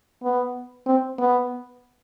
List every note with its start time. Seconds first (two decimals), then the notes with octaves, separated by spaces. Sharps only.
0.23 B3
0.86 C4
1.19 B3